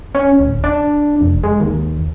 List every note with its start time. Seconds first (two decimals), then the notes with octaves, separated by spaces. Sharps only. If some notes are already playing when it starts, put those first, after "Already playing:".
0.15 C#4
0.40 D1
0.64 D4
1.21 F1
1.44 G#3
1.60 D#2